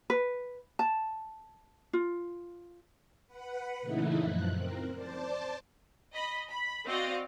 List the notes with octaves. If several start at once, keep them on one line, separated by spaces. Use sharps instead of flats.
B4
A5
F4
B4 F#5
A#2 C#3 E3 A3 D#4 E4
F#2 F3 F#6
C4 A#4
C5 D5 A5
D#5 B5
B5
C4 F#4 D5 D#5 F5